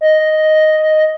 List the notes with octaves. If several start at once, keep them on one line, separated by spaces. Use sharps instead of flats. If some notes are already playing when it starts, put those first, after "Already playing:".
D#5